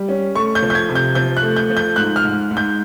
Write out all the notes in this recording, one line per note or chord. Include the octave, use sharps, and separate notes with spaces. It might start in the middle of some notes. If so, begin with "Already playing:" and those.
Already playing: G3
C#4
A3 C#6
G6
F3
G6
G#6
C3
G6
F3 G6
F#6
A3
G6
F3
G6
G#2 F#6
F6
G#2
G#2
G6